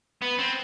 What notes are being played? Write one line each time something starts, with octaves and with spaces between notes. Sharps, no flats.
B3
C4